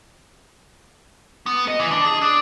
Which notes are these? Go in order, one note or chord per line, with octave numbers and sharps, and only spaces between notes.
B3
D#5
E3
D4
G#4
D4